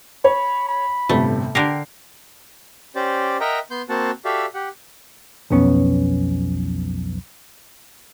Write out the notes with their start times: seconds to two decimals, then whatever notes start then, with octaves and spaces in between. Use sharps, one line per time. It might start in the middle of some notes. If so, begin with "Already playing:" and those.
0.24 C#5 B5
0.69 B5
1.09 G1 A2 C3 A3
1.55 D3 G4 A#4 G5 C7
2.96 C#4 G4 C5 D5
3.41 A#4 D#5 E5 F#5 G5 A#5
3.71 B3 C6 G6
3.89 A#3 C4 F#4 F#5 A5
4.25 F#4 G4 A4 D5 E5 F5
4.54 G4 F#5
5.50 B1 F2 B3 C#4